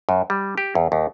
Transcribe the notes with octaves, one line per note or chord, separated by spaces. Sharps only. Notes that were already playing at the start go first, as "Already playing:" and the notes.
F#2
G3
G4
E2
D#2